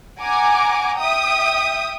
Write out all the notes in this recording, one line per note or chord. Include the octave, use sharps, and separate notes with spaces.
F#5 G#5 A#5 D6
E5 G5 D#6